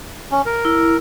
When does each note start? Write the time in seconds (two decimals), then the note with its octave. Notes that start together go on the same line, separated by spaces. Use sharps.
0.31 C#4
0.46 A#4
0.65 E4